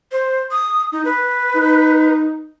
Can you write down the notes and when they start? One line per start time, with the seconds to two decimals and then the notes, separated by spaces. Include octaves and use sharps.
0.12 C5
0.51 D#6
0.92 D#4
1.05 B4
1.55 D#4